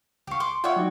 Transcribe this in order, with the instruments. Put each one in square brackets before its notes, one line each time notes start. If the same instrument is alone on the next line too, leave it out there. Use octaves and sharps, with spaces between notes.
[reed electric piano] C#2 C#6 [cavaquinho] G4 F5
[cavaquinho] C6 D6
[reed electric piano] F4 D5 E5 [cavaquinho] C#5 F#5 G5
[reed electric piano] F#3 D#4 F#4